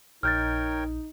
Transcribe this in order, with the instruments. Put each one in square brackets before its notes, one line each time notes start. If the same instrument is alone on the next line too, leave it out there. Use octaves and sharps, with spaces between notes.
[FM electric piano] A#1 [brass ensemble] D#4 [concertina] A#4 C#5 G5 [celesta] F6 G6 A6